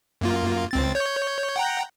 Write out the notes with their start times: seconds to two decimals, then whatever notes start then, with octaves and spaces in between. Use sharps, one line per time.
0.21 F#2 A#3 F4
0.71 C#2 C4 A6
0.95 C#5 G6
1.56 F#5 G5 A#5